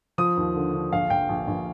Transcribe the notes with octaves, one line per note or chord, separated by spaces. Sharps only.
F3 D#6
D#2
D3
D3
A#1 F5
A#1 G5
A#1
A#1